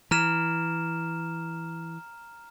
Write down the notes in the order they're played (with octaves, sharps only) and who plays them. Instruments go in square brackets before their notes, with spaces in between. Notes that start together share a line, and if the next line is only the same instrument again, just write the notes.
[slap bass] E3 [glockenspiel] A#5 F6 E7